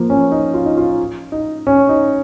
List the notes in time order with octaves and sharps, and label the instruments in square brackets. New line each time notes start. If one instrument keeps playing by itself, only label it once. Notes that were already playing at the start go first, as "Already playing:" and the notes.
Already playing: [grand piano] F3 A#3
C#4
D#4
F4
D#4
F4
D#4
C#4
D#4